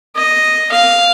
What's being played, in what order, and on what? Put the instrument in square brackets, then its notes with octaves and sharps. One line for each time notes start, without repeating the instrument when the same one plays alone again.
[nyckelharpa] D#5
F5